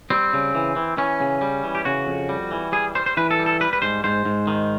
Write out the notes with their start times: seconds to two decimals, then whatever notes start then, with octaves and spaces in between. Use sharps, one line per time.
0.10 G3 C4
0.33 C#3
0.55 E3
0.76 E3
0.98 E3 C#4
1.21 C#3
1.41 G3
1.64 E3
1.75 G4
1.85 C#3 F#4
2.07 F2
2.29 G3
2.51 E3
2.72 G3 G#4
2.95 G3 C5
3.06 C5
3.17 E3 B4
3.31 A4
3.39 G3
3.46 A4
3.60 G3 B4
3.73 B4
3.82 G#2 C5
4.04 G#2 C5
4.25 G#2
4.47 D#3